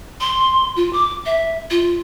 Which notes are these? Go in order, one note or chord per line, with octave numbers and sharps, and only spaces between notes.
C6
F4
D6
E5
F4